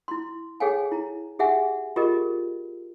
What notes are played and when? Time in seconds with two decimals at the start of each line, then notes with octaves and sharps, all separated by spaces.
0.08 E4 C6
0.60 G#4 A4 C#5 F5 G5 G#5
0.92 E4 A#5
1.39 G4 G#4 E5 F#5 G#5
1.96 F4 G4 G#4 A#4 D#5